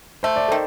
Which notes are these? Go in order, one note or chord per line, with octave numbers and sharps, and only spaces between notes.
A3 C5
D5
D#3 A4 C5